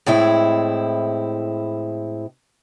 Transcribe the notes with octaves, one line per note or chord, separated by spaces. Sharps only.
A2 G#3 C4 E4